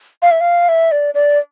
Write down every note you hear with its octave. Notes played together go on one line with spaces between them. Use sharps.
F5
E5
F5
E5
D5
D5